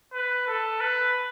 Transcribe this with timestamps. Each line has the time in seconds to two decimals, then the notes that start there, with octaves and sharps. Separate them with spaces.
0.14 B4
0.47 A4
0.81 B4